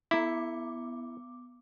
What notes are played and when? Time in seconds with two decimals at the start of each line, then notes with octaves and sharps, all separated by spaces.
0.11 B3 E4 D6